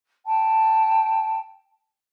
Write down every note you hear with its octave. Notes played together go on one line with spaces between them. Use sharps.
G5 A5